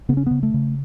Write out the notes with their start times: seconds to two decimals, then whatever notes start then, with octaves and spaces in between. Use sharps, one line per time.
0.09 C#3 B3
0.17 C#4
0.26 C#3 B3
0.43 A3
0.54 C#3